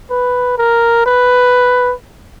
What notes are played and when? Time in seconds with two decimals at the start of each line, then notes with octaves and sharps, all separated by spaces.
0.10 B4
0.58 A#4
1.06 B4